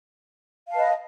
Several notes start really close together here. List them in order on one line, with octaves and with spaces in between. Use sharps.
F5 A5 B4 D#5